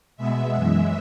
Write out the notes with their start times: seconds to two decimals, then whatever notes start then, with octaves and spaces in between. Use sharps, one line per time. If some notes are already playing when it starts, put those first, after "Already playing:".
0.17 B2 G#3 B3 E5
0.55 F#2 E3 G#3